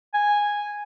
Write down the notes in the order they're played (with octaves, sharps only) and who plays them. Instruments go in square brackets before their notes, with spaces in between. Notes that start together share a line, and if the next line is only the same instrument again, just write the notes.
[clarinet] G#5